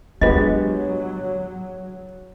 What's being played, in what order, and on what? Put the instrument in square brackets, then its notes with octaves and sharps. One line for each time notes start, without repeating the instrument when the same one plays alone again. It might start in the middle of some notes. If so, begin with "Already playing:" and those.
[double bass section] F#3 [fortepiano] G#3 B3 G4 [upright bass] D4 [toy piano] F4 D#5